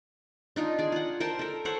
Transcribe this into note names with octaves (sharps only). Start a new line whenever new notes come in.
D4 D#4 F4
G#4 D5
F4 F#5
A#4 C5 G5 A5
A4 A#4
A4 C5 C#5 F#5